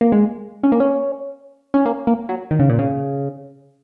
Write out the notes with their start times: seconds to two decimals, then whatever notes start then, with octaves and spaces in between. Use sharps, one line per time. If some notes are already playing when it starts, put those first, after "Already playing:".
0.01 A#3
0.12 G#3
0.63 C#4
0.72 A#3
0.80 C#4
1.74 C#4
1.86 A#3
2.07 A#3
2.29 F#3
2.51 D#3
2.60 C#3
2.69 A#2
2.79 C#3